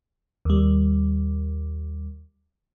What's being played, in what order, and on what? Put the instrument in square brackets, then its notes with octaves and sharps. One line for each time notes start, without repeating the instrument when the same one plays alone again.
[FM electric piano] D#2 G3